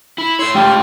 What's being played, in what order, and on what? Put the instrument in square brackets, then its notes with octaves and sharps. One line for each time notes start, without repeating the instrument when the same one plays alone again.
[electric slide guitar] E4 [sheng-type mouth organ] B5
[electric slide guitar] A4 C#5 [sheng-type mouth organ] C6 E6
[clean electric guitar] C#2 A3 G5 [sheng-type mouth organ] F4 G4